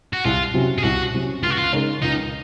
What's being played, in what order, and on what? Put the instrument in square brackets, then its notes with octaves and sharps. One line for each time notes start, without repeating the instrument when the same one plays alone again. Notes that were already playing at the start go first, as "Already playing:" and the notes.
[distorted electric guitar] F#4
[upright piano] C2 [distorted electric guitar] F4
[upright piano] C3 F#3 C#4
[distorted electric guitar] G#4
[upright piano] C2 [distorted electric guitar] F#4
[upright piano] C3 F#3 C#4
[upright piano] C#2 [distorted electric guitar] F4
[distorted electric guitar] F#4
F4
[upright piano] C#3 G#3 D#4 A#4
[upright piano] C#2 [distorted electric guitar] D#4